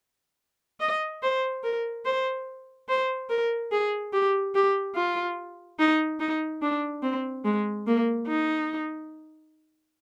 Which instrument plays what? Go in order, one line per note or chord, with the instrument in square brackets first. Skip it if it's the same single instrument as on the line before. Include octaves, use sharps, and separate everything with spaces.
[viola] D#5
C5
A#4
C5
C5
A#4
G#4
G4
G4
F4
D#4
D#4
D4
C4
G#3
A#3
D#4